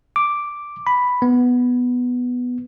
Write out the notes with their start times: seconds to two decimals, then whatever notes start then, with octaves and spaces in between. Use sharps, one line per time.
0.16 D6
0.87 B5
1.22 B3